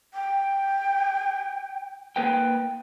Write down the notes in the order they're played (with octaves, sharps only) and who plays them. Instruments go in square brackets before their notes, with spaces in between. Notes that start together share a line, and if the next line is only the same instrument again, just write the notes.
[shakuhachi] G5
[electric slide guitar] A#3 B4 G5